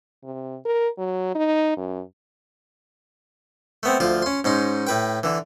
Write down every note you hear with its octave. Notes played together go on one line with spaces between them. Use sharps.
C3
A#4
F#3
D#4
F#2
A3 B3 C4
D2 F3 F4
C#4 C6
G#2 C#4 D#4 C6
A2 B4 G5
D3 E3